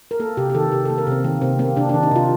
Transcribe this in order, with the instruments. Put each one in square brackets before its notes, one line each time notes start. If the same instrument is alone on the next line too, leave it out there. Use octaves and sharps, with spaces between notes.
[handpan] A#4
A#3 A4
C3 G4
G4
D#3 A4
C3 G4
A4
A#3
A#4
C3 C4
D#3 A#3
C3 C4
A#3 C4
C3 D4
D4
D#3
D#4
C3 F4